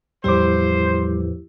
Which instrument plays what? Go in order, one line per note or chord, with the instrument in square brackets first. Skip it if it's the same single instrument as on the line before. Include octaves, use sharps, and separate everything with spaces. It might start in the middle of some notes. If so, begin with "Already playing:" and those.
[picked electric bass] E2 A2 F3 [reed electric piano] G3 D6 [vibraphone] E4 G4 [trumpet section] C5